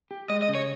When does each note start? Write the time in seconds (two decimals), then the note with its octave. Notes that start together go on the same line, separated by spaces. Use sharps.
0.11 G4
0.29 G#3 D#5
0.42 D#5
0.48 C#3
0.55 C#5